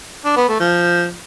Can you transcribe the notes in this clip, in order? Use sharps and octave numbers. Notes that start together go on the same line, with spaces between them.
D4
B3
A3
F3